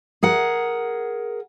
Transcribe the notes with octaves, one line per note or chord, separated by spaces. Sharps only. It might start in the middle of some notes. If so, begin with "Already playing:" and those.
G#4 A#4 F#5